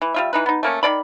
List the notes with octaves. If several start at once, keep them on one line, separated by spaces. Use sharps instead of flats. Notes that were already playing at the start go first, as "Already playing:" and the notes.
E3
G3 F4 E5
E3 D#4 B4
B3 D#4
A3 A#3 C#4
D#3 D4 D5 B5